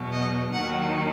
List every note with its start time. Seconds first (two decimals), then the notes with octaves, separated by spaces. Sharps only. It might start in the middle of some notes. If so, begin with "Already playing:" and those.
Already playing: E2 B2 F#3
0.12 D#5
0.52 D#2 D#3 F#3 F#5